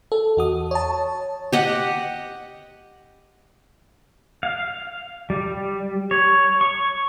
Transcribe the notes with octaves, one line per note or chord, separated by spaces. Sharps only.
A4
E2 F#4 D#6
C#5 A5
G4 D#5 F#5
F5
G3
C#5
C#6